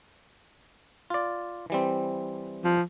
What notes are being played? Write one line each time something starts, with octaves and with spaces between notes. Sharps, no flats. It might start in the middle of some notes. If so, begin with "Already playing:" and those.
F4 D5
E3 G3 C4
F3